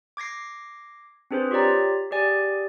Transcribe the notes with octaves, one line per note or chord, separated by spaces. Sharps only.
D6 G#6 A#6 C7
C4 D4 G#4 B4 C5
F4 G4 C#5 D5 A#5
G4 G#4 D5 G#5